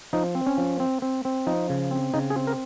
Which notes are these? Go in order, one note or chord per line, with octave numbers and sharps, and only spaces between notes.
F3 D#4
C4
C#4
F3
C4
C4
C4
F3 D#4
C#3
C4
C#3 D#4
G#4
C4
A#4